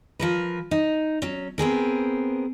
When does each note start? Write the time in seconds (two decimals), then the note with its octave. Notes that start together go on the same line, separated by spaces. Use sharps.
0.19 F3 A#4 B4
0.71 D#4
1.22 F#3 C#4
1.58 B3 C4 G#4 A#4